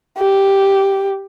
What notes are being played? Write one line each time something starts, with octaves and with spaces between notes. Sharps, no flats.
G4